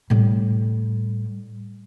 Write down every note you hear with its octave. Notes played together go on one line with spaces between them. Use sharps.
A2 G3